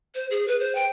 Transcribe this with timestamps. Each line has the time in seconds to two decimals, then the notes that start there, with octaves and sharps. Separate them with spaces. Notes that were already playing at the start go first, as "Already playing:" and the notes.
0.15 C5
0.31 G#4
0.48 B4
0.60 C5
0.75 G5